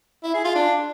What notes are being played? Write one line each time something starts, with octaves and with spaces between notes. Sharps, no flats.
E4
G#4
F4
D4